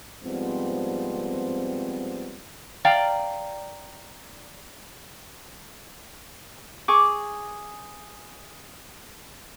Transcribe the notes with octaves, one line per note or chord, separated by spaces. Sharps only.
G#2 F3 G3 B3 C4
D5 F5 G5 A#5
G#4 C#6 D6